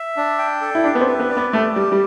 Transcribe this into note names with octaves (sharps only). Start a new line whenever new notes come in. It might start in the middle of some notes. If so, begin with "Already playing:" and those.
Already playing: E5
D4
G5
A4
E4
D4 G4
B3
C4
B4
B3
D5
B3
A3 G4
G3 G4
G3